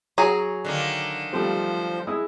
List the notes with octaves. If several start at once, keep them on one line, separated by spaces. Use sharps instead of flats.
F#3 G#4 A#5
D3 D#3 A#3
F3 G3 A3 C5
G#3 E4 D#6